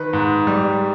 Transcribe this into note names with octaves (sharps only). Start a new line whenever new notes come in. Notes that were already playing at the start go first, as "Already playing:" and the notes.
Already playing: D#3 B4
G#2
G3